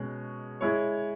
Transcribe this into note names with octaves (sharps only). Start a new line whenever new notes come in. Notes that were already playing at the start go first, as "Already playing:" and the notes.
Already playing: B2 G#3 C#4
G#3 E4 C#5